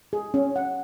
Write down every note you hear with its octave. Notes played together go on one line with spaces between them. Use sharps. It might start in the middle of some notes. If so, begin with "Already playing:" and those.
G#4
C#4
F#5